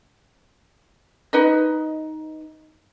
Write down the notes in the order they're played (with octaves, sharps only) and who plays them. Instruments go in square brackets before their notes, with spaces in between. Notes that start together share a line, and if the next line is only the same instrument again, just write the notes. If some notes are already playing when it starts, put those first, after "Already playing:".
[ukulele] D#4 B4 D#5